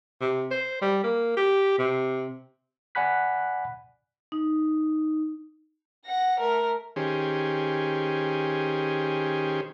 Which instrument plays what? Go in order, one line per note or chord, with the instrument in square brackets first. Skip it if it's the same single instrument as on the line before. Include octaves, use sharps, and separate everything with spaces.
[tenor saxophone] C3
C5
G3
A#3
G4
C3
[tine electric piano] D5 F#5 G#5 B5 F#6 B6
[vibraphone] D#4
[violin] F#5 A#6
A3 A#4
[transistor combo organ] D#3 C#4 G4 G#4 C5